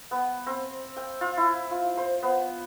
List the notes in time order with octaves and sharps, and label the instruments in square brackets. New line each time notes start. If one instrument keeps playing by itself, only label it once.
[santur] B3
C4
G5
F4
E4
F4
C5
B3